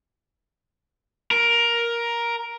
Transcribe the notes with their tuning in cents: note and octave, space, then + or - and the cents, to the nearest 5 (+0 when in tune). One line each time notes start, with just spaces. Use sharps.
A#4 +10